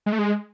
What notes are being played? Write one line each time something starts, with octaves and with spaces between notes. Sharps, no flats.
G#3
A3
G#3